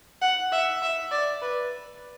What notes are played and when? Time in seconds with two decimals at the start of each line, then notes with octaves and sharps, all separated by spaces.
0.21 F#5
0.52 E5
0.82 E5
1.11 D5
1.42 B4